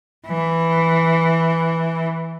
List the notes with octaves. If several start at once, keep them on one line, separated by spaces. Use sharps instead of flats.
E3